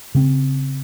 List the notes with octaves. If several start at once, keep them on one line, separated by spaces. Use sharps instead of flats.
C#3 C4